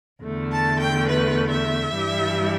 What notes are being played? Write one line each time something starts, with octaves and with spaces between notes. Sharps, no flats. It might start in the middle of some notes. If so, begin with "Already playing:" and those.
E2 D3 A3
A5
G5
B4
E5
G2 E3 G3